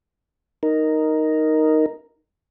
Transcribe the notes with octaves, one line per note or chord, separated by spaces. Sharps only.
D#4 A#4